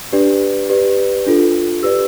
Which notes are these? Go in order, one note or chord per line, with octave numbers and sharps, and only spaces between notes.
D4 G4 B4 D5
G4 B4 D5
D4 F4 A4
G4 B4 D5 E6